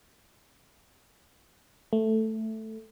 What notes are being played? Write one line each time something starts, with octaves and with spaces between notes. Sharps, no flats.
A3